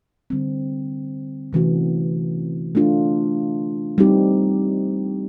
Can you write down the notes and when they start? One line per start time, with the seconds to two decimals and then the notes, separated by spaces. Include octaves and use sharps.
0.30 D3 G3 C4
1.53 C3 E3 A3 C#4 F#4
2.75 A3 D4 F4
3.98 G3 C4 D#4 G4